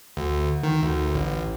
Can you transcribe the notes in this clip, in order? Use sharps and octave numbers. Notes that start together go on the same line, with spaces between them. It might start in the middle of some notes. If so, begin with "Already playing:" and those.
D2
D#3
D2
A1